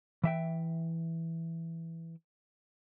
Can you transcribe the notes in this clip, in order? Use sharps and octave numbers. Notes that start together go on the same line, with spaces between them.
E3 E5 G5